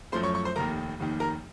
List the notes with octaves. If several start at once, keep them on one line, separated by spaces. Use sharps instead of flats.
F#2 F3 A3 C5 C6
C#5 C#6
C#5 C#6
C5 C6
F1 D#2 D#3 A#4 A#5
F1 D#2 D#3
A#4 A#5